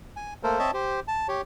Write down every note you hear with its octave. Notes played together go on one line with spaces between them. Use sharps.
G#5
A3 A#3 A4 A#4 C5
C4 C#5 D#5 E5 A5
G4 C5
A5
G4 C#5